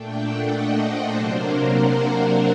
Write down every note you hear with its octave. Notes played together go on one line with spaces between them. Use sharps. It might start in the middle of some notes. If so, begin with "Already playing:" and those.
Already playing: A#2 A3 D4 G5
F#5
D#5
C5
C3 F#3 A#3 D4 C5
A#4
F#4
F#4